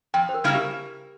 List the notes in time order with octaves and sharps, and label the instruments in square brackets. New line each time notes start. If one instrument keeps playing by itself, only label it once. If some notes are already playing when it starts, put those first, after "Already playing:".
[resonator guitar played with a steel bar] F2 [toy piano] G5
[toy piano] C5
A#4
[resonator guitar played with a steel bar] C#3 G3 A#3 E4
[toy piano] G4